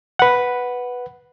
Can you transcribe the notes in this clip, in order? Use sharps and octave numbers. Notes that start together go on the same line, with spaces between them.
B4 F#5